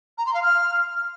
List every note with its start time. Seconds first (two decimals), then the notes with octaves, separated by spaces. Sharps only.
0.18 A#5
0.26 C6
0.34 F5
0.43 F6